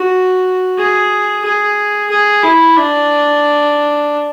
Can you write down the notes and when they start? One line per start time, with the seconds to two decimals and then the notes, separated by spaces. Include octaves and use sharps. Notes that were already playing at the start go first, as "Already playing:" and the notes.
Already playing: F#4
0.78 G#4
1.45 G#4
2.10 G#4
2.43 E4
2.77 D4